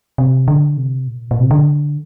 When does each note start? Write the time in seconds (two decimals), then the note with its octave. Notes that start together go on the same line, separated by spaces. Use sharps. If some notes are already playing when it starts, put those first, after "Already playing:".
0.18 C3
0.48 D3
0.77 C3
1.07 A#2
1.31 A#2
1.40 C3
1.51 D3